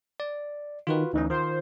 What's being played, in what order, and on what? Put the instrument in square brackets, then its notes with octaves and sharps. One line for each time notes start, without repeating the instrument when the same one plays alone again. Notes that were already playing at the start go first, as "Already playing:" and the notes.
[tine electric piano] D5
[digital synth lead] D#3 [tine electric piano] F4 F#4 B4
[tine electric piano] D2 E3 C#4 [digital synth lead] D#4
[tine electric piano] D#3 F4 [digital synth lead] C5